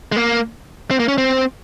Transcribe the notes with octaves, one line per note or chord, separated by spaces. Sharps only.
G#3
A#3
C4
A#3
C#4
C4